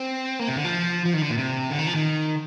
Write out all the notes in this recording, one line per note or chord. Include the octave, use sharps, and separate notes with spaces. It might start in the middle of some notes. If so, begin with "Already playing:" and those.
Already playing: C4
A#3
C3
D3
F3
F3
D#3
D3
A#2
C3
D3
D#3
F3
D#3